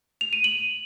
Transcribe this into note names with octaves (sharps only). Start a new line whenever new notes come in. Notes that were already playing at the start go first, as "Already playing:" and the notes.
F7
D#7
F#7